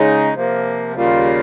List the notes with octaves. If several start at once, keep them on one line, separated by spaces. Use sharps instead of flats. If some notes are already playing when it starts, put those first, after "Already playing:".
Already playing: C#3 G#3 D#4
C3 F3 A#3
D#2 C#3 G3 A#3 F4